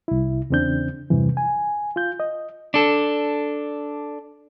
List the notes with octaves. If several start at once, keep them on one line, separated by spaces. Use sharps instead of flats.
C2 E4
E2 C#3 C4 D4 G6
E2 G2 C3 E3
G#5
F4 G6
D#5
D4 A4